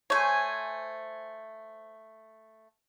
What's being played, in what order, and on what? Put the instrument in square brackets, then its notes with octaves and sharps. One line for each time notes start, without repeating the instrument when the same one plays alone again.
[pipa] A3 C#5 [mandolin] C5 G#5